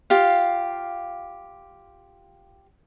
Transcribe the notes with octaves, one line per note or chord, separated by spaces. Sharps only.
F4 G4 F5